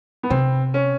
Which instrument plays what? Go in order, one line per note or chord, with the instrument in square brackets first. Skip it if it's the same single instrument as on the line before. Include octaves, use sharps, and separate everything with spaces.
[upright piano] B3
[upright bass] C3 [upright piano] C4
[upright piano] C#4